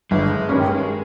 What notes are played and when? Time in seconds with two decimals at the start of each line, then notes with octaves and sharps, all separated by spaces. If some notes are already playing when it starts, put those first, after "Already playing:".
0.11 G1 G#3
0.49 G2 D#3 G3 C#4